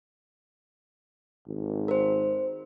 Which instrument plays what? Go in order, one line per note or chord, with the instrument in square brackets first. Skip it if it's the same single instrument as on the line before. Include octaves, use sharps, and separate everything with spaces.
[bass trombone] G#1
[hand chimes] A#4 C5